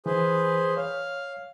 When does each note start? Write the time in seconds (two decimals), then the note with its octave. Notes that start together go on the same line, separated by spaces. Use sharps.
0.06 E3 G#4 B4 C5
0.77 C#5 F5